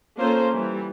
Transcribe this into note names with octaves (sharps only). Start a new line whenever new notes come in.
A#3 C#4 F4 A4 C5
E3 G3